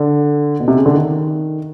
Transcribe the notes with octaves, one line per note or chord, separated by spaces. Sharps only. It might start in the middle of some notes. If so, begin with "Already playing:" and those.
Already playing: D3
B2
C3
C#3
D3
D#3